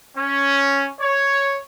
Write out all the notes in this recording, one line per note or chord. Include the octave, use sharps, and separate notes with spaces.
C#4
C#5